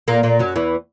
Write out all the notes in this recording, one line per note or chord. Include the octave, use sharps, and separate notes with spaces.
A#2 A#3
A#2 A#3
F#2 F#3
E2 E3